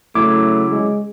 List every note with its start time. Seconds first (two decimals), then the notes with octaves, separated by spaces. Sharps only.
0.15 C#3 F#3 A3 E4 D6
0.70 G#3